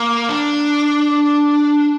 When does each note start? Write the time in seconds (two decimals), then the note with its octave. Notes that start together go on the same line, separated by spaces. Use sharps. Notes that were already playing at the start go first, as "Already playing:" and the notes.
Already playing: A#3
0.29 D4